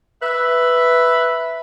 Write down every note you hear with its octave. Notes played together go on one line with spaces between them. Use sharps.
B4 E5